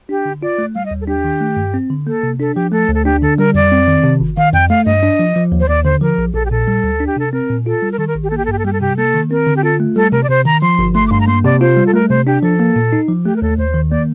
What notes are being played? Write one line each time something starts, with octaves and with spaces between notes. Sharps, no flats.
D4 G4
D3
F4 D5
A3
G3 F5
D#5
D#2
A4
D4 G4
D#3
A3
G2
C4
D3
A#3 A4
C3
D4 A4
F3 G4
A3 A4
D2
A4
D4 G4
D3 A4
G3 A#4
F2 D5
C4
D#3
C3
G1
D#3 F5
F2 G5
A3 F5
G2 D#5
D4
F3
F3
D#2
C5
D#2 D5
D3 C5
F3 A#4
A#1
A#1 A4
G4
A#2 A4
G3
D2
D4
G4
C3 A4
C4 A#4
A#2
F4 A4
G3
A#4
D#3 A4
A#4
A1
G4
A#3 A4
G4
A4
G2 G4
A4
G3 G4
A4
C3 G4
A#3 A4
D#3
C4 A#4
D3
G4
F4 A4
A3
G3 A4
C3 A#4
D5
C3 C5
D#3 A#5
F3 C6
G1
A3 C6
D6
G2 C6
A#5
A#3 C6
C3 D5
F4 C5
G3
A4
A3 A#4
C3 C5
D4 G4
F3 A4
A#3
A#2
D#4
F3
A3 G4
A#4
D#2 A4
D#2 C5
D#3
A#3 D5